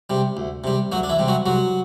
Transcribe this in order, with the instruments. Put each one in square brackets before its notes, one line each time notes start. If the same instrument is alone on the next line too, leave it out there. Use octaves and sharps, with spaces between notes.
[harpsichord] C3 G3
D2
C3 G3
D2 F#3 F#4
D4
E3 E4
C3 G3
F#3 F#4
C2 F#3 F#4